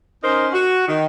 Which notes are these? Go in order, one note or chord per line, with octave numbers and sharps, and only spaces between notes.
C#4 D#4 A#4 C5
F#4
D#3